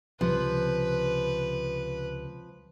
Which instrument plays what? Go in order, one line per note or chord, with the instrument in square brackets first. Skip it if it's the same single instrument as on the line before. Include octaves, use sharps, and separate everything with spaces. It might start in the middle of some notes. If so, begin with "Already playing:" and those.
[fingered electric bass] C#2 C3 [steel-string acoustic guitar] F3 [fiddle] B4